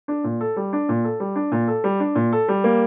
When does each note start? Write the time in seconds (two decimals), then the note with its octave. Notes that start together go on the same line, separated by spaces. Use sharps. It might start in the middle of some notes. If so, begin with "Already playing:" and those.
0.08 D4
0.24 A#2
0.41 A4
0.56 G3
0.73 D4
0.89 A#2
1.04 A4
1.20 G3
1.36 D4
1.52 A#2
1.68 A4
1.84 G3
2.00 D4
2.15 A#2
2.33 A4
2.48 G3
2.64 A#3